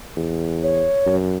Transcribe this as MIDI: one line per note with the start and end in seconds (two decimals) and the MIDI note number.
0.16 0.84 40
0.63 1.15 73
1.06 1.38 42